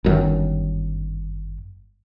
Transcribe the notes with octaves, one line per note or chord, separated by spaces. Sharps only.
G1 F#2 D#3